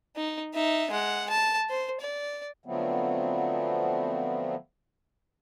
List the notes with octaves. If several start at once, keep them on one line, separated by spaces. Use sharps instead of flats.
D#4
D#4 E5
G#3 F#5
A5
C5
D5
D3 F3 F#3 A3 B3 C4